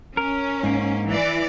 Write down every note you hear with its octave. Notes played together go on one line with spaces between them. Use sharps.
C#4 A#4
G#2 A#3
E3 D5